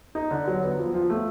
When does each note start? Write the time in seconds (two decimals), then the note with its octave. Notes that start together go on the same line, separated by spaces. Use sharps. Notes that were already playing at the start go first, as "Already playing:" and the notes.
0.15 D#4
0.31 D3
0.47 F#3
0.62 B3
0.78 F3
0.94 F3
1.10 A3